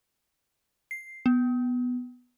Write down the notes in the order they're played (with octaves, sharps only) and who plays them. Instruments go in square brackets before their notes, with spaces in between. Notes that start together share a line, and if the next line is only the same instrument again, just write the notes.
[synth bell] C7
B3